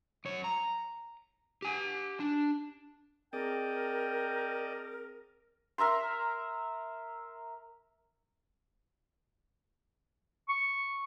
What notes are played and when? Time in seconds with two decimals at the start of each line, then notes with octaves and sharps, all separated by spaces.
0.25 F#2 C#5
0.44 A#5
1.62 G4 G#5
2.20 D4
3.33 C4 G#4 A#4 D5 D#5 G5 A5
5.78 A#4 E5 A#5 C6
10.49 C#6